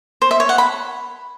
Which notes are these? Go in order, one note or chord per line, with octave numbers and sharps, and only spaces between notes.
C5
E5
C#5
F#5
B5